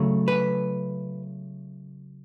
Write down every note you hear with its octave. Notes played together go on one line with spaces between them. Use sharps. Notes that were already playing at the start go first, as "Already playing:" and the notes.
Already playing: C#3 F#3 A3
B4